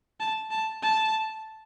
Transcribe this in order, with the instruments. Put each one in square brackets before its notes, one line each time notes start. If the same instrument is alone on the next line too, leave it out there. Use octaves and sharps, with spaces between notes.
[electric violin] A5
A5
A5